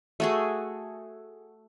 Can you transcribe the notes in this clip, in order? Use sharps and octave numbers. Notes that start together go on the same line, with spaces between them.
A3 F#4 G#4